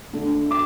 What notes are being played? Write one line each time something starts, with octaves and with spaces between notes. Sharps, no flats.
D3 A3 D4
D6